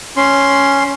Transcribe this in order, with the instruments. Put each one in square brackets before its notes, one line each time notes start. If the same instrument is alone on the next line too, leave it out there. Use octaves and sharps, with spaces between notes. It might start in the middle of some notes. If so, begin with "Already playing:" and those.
[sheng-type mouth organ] C#4 C6